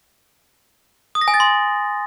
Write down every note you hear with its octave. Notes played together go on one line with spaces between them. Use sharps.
D#6
A#6
G#5
A6
C6